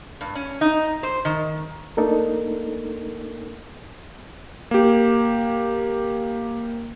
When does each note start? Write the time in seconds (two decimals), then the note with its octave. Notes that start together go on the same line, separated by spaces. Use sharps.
0.21 G2
0.35 C#4
0.61 D#4
1.03 C5
1.25 D#3
1.97 A3 A#3 D4 D#4 A4 A#4
4.71 A#3 G4